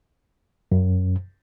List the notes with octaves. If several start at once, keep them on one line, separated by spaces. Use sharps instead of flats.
F#2